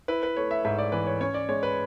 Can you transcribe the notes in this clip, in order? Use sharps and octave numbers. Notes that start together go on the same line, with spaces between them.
E4 B4
B4
A3 C#5
E5
G#2 E5
D5
E3 B4
C#5
C#4 C#5
D5
G#3 C#5
B4